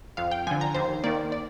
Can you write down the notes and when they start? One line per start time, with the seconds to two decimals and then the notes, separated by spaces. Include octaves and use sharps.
0.17 F2 F5
0.31 G5
0.47 D3 F3 G#5
0.61 A#5
0.75 D#2 C5
1.04 D#3 A#3 D5
1.32 D5